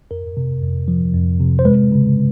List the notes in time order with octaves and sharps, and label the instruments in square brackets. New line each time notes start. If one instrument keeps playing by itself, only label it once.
[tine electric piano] F2 A#4
C3
F2
F3
F2
C3
C5
G#3 B4
C#3